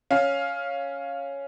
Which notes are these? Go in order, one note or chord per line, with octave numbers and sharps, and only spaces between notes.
C#4 F5